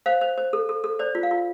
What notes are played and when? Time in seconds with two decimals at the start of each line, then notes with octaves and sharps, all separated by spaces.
0.06 C5 F5
0.21 C5
0.38 C5
0.53 A4
0.69 A4
0.84 A4
0.99 C5 D5
1.15 F4
1.23 F5
1.31 F4